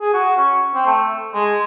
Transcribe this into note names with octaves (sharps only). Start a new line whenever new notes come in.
G#4
F#4
C#4
C4
A3
G#3